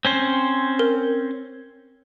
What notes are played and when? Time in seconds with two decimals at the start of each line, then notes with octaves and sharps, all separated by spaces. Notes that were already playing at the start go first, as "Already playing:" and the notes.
0.05 C4 C#4 C5
0.79 A#4